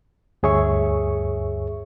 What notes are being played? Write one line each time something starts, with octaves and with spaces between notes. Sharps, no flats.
D2 G2 G#4 C#5 E5 C#6